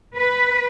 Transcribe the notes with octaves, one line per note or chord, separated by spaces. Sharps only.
B4